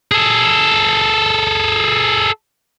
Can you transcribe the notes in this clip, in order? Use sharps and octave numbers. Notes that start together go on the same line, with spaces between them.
G#4 A4